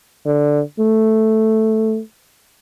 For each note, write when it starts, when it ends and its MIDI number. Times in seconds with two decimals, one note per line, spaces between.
0.26 0.61 50
0.79 2.01 57